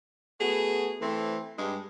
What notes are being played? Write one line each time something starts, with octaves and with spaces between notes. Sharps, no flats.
A3 B3 F#4 G#4
E3 A3 C4
G2 G#3